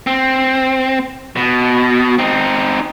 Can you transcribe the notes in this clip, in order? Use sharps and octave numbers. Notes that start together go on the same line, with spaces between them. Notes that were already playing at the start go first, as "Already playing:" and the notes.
C4
B2
C4 D#4